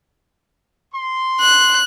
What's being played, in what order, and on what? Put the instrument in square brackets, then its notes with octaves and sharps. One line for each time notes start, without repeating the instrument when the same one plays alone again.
[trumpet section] C6
[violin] F#6